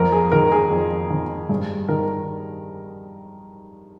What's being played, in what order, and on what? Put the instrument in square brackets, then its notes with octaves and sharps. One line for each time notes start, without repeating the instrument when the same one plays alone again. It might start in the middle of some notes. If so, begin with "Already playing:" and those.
Already playing: [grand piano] F2 A#4
G#4
D#3 A#4
G#4
F2
D#3
G2 G#4
D#3 A#4